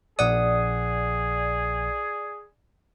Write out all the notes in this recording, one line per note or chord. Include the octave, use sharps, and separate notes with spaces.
A#1 G#4 D5 F#5 D#6